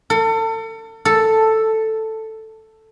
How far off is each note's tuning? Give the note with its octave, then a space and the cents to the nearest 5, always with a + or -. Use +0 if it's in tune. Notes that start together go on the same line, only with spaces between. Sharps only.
A4 +35
A4 +5